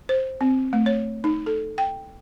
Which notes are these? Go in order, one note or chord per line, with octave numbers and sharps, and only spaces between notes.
C5
C4
A3
C#5
D#4
A4
G5